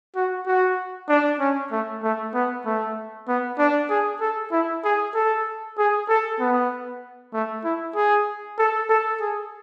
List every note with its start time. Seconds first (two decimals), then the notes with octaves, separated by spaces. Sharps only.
0.16 F#4
0.47 F#4
1.09 D4
1.40 C#4
1.72 A3
2.03 A3
2.34 B3
2.65 A3
3.28 B3
3.59 D4
3.90 G#4
4.21 A4
4.52 E4
4.84 G#4
5.14 A4
5.78 G#4
6.09 A4
6.40 B3
7.34 A3
7.64 E4
7.96 G#4
8.58 A4
8.89 A4
9.20 G#4